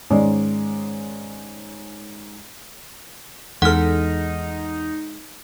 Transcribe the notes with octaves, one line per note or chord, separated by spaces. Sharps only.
G#2 D#3 G#3 C#4 D5
E2 G#3 D#4 A4 F#5 F6